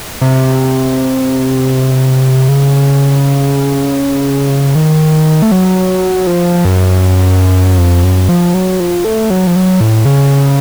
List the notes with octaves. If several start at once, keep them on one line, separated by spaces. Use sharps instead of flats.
C3
C#3
D#3
A3
F#3
F3
F#2
F2
F#2
F3
F#3
F3
A3
F#3
F3
F#3
A2
C#3